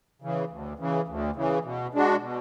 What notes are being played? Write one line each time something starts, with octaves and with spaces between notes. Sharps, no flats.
C#3 E3
D2
C#3 E3
D2
C#3 E3
B2
G#3 D4 F#4
B2